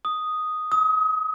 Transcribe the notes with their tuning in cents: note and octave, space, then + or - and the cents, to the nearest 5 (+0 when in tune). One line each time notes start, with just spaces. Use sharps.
D#6 +0
D#6 +35